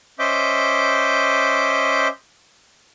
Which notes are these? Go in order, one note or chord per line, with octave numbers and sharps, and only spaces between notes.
C#4 C5 D#5 E5 D6 G6